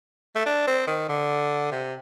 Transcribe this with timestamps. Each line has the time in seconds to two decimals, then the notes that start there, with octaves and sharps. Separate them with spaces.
0.35 A3
0.46 D4
0.67 C4
0.87 D#3
1.09 D3
1.71 C3